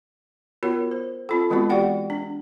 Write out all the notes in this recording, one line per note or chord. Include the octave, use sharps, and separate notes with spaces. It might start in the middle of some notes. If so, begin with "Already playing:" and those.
B3 F4 F#4 A#4 C#5
C5
C4 F4 A4
E3 G#3 B3 C4 F4 F#4
F#4 G4 D5 F#5 G5
D4